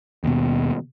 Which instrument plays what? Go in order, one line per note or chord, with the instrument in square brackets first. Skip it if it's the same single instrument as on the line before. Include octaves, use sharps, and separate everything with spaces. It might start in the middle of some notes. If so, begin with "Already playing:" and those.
[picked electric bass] D#2 B2